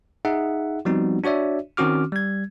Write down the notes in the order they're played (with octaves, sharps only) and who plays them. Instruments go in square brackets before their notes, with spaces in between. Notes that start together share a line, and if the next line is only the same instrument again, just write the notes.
[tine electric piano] D#4 G#4 E5 F#5
F3 G3 B3 C4 D#4 F#4
D4 F#4 C#5 D5 E5
D#3 C4 C#4 F#4 D6 F6
G3 G#6